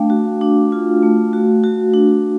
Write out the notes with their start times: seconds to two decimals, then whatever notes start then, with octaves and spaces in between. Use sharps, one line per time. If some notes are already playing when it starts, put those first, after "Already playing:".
Already playing: A3 D4 F5 G5
0.10 F#4
0.41 D4
0.72 F4
1.03 A3
1.33 F#4
1.64 F#4
1.93 D4